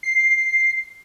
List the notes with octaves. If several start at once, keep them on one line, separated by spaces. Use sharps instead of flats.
C7